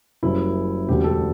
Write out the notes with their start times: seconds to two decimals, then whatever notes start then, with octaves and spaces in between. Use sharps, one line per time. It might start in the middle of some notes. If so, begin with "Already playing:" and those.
0.23 F#1 F#2 C#3 G3 E4
0.88 E1 D2 D3 G4
1.04 A4